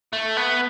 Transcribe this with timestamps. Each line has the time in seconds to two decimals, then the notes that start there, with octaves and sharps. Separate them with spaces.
0.13 A3
0.37 B3